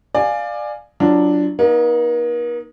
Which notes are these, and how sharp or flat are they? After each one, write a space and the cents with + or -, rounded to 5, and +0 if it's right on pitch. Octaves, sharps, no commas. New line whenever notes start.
D5 +20 F5 +0 G#5 +0
F#3 +0 D4 +0 F4 -30
A#3 +45 D#4 +5